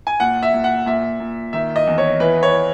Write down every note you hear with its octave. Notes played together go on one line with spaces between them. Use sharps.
G#5
A#2 F#5
E5
A#2
F#5
A#2 E5
A#2
D#3 E5
D#5
E2
C#5
E3 B4
C#5